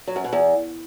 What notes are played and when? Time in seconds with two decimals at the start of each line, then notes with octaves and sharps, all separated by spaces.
0.07 F#3
0.16 F#2
0.24 B2
0.33 E2